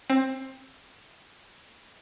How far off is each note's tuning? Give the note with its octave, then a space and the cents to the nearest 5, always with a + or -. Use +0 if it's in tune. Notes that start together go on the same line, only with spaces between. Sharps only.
C4 +20